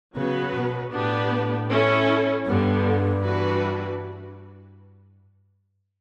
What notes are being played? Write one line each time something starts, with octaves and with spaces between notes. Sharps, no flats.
C#3 F#3 B3 F#4 B4
B2
A2 B3 D4 G4 B4
C#4 E4 A4
G2 D3 G3 B3
E3 G3 D4 F#4 B4